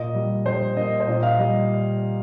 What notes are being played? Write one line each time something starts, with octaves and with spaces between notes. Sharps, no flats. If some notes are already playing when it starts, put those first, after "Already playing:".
Already playing: A#2 D#5
G3
G3 C5
A#3 D#5
C5
A#2 D#5
F5
G3 D#5